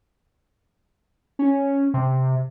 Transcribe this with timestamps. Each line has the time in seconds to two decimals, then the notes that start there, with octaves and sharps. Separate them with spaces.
1.39 C#4
1.94 C3